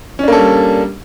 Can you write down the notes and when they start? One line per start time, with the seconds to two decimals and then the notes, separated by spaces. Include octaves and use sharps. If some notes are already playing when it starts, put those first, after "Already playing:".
0.19 C#4
0.23 D4
0.28 A#3
0.32 A4
0.37 G3